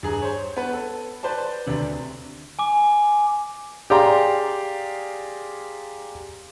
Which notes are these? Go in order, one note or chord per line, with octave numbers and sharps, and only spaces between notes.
G2 G#4 A#5
C5 C#5
B3 B4
A4
B4 C5 D5 A5
D2 C3 D4
G#5 D6
G4 G#4 D5 F5 A#5 C6